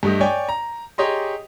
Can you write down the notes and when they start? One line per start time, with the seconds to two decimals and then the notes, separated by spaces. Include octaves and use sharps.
0.03 G2 A3 G4 D#5
0.21 C#5 D5 G5 G#5
0.49 A#5
0.98 G4 G#4 C#5 D#5 A#5 C6